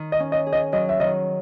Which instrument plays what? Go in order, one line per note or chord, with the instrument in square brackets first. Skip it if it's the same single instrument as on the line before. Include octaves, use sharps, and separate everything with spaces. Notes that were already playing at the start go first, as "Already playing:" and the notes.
Already playing: [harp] D#3
[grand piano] D#5
[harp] C#4
[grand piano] D#5
[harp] G#4
[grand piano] D#5
[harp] F#3 [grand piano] D#5
[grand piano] E5
[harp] D#3 [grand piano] D#5